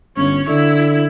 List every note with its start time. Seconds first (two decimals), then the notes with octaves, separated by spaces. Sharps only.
0.16 G1 C#4 C#5
0.48 D3 E4